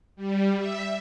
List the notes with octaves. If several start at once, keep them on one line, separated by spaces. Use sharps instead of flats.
G3
E5